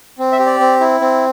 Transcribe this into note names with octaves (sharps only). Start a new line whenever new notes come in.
C4
E5
G4
D5
C4
E4
C4